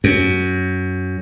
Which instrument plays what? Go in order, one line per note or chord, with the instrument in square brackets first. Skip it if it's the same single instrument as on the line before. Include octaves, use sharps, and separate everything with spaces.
[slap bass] F#2